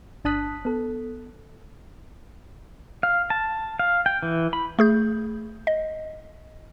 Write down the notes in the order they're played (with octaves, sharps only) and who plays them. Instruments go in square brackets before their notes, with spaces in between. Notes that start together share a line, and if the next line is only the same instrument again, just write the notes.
[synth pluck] G1 D4 A5 D#6 F#6 B6
B3 A4
[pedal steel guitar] F5
A5
F5
G5
E3
B5
[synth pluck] A3 G#4 G6
D#5